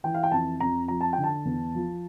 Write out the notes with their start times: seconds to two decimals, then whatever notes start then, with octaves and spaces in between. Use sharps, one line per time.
0.04 E3 G5
0.14 F5
0.23 G5
0.31 F2 A5
0.60 F2 A#5
0.88 F3 A#5
1.01 A5
1.13 D3 G5
1.24 A5
1.45 E2
1.75 F3